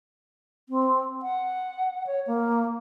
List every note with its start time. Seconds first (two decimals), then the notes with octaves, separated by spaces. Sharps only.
0.69 C4
1.22 F#5
2.07 C#5
2.27 A#3